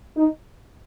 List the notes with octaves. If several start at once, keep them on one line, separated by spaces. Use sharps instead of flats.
D#4